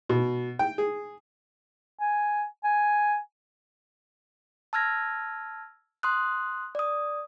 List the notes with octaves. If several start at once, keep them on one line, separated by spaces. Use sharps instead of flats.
B2
G5
G#4
G#5
G#5
A5 E6 F6 G#6 A#6
C6 D#6 F#6
D5 D#6